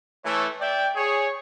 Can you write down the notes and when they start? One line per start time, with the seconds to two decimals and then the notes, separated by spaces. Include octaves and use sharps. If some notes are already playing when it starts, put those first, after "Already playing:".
0.24 E3 A3 A4 C#5
0.60 D5 E5 G5
0.95 G#4 C#5